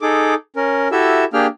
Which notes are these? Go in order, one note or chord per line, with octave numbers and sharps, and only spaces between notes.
D#4 G#4 A4 D6
C#4 A#4
E4 F#4 G4 A4 E5 E6
A#3 D4 G4 G#4 G5 F6